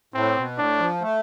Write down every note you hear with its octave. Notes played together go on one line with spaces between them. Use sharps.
A2 C4
B2
A2 D4
F3
A3